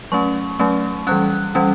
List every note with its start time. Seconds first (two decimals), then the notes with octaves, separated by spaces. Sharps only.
0.12 F#3 A3 C#4 C#6
0.59 F#3 A3 C#4
1.07 E3 G3 C#4 F#6
1.55 E3 G3 C#4